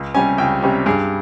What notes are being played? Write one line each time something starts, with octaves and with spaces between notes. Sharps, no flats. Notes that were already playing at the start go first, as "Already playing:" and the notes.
Already playing: C#2
C3 G3 C#4 G#5
C#2 G5
C3 G3 C#4
G2 G#4